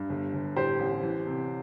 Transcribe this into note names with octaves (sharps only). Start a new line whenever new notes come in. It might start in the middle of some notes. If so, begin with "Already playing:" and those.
Already playing: G2
G1
G1
A2 G4 C5
A1
E3
C3